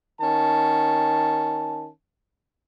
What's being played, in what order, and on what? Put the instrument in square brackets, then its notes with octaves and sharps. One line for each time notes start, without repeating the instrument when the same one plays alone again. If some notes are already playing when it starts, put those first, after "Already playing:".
[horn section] D#3 C#4 A5